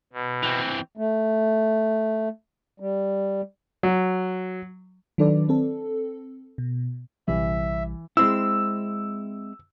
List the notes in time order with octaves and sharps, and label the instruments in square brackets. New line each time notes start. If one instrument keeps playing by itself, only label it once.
[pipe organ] B2
[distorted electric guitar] E3 C4
[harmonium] A3
G3
[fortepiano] F#3
[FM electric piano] D#3 F#3 D4 A4 B4 D5
C4 A4
B2
[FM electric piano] A#1 C3 G3 [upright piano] E3 [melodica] E5
[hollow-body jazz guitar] G#3 C4 E4 [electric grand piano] E6